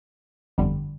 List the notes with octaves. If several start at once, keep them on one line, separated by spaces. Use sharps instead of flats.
G1 F2 D3 G3